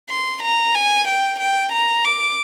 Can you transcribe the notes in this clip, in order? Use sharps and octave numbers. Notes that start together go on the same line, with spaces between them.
C6
A#5
G#5
G5
G5
A#5
D6